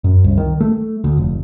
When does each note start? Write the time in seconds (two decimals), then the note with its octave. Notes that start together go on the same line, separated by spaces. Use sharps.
0.04 F#2
0.24 C2
0.38 D#3
0.61 A3
1.04 D2
1.18 F1